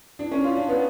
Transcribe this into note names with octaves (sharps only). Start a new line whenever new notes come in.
D4
C#4
F4
D4
B3